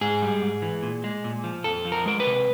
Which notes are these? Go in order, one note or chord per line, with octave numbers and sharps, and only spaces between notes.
G#2 G#4
G3
G#2
E3
A#2
G#3
A#2
F3
F2 A4
F3
A#4
G#3 A#4
B4
C3